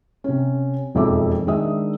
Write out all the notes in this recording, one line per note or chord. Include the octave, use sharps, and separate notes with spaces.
C3 C#4
E1 F2 D#4 E5 D6
D#3 G#3 D4 D#5 E5 D#6